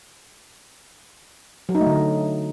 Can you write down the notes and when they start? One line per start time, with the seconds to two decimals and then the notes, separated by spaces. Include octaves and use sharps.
1.69 F#3
1.75 D#4
1.81 A3
1.87 D3